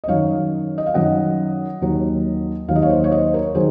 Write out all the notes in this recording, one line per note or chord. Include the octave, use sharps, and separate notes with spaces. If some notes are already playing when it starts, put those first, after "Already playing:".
D#5
F#2 D#3 F#3 C#5 F5
D#5
F5
F#2 D#3 F#3 D#5 F#5
D#2 D#3 F#3
D#2 D#3 F#3 F5
D#5
C#5 F5
C5 D#5
C#5
C5 D#5
A#4 C#5
D#3 F#3 G#4 C5